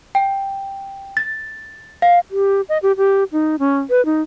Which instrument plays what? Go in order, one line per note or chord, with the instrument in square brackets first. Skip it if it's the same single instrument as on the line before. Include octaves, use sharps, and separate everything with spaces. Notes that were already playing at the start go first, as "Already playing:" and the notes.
[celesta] G5
A6
F5
[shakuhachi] G4
D#5
G4
G4
D#4
C#4
B4
D#4